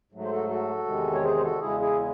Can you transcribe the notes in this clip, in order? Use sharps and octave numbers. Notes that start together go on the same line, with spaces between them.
G#2 F#3 A3
C5
F#4 A4
F#4 A4
E2 C3 D#3 G#3
C#5
G#4 C5
C5
F#4 A4
E2 C#3 G#3 E4 G#4
E4 G#4